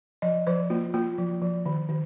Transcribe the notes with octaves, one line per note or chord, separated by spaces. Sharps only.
F3 D#5
F3 C5
A#3 F4
A#3 F4
F3
F3
D#3
D#3